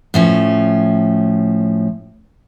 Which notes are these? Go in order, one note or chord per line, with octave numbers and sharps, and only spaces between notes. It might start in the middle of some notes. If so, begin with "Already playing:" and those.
A2 F3 C#4